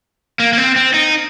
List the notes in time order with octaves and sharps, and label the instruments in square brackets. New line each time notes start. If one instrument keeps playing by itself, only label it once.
[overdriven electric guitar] A#3
A#3
C4
C4
D#4